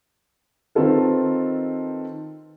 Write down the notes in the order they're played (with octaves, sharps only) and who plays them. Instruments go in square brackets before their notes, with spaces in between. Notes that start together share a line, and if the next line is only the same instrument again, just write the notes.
[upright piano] D#3 C4 D#4 F4 A4 B4